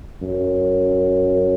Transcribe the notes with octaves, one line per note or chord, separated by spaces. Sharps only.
F#2